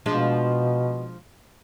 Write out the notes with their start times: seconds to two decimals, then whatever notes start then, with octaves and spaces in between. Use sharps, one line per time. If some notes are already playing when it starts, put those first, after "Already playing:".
0.06 B2 F3 G#3 D4